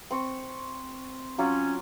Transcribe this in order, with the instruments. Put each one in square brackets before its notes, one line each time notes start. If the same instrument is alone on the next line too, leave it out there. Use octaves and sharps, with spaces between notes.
[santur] C4 C#6
[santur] F#3 F4 D6 [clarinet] C#4